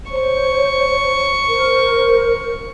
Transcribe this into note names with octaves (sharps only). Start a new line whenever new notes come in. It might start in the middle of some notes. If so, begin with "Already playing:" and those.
C5 C#5 C#6
A#4 C5